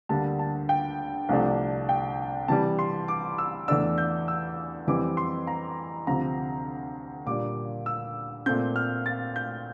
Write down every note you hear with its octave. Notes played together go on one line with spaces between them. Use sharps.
D2 D3 G3 A#3 A5
A5
G5
C2 C3 F3 A3 D4
G5
C3 E3 G3 A5
C6
D6
E6
E2 E3 A3 D4 E6
G6
E6
F2 E3 G3 C4 D6
C6
A#5
D2 C3 F3 C4 A#5
A#2 G3 D4 D6
E6
A#2 A3 C4 G6
F6
A6
G6